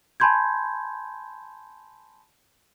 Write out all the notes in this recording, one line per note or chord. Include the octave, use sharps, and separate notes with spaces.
G#5 A5 B5 C6 G6 G#6